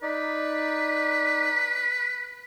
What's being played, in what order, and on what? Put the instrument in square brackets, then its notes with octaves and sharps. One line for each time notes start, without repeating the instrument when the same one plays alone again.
[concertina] D#4 D5 [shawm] B4